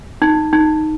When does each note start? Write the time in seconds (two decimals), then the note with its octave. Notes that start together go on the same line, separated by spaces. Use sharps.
0.22 D#4
0.53 D#4